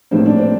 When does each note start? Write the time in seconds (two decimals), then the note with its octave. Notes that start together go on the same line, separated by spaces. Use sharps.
0.11 A#1 A2 G3 A#3 C4
0.26 D4
0.39 C4